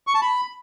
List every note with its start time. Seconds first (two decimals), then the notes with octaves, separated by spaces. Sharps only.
0.07 C#6
0.14 A5
0.22 B5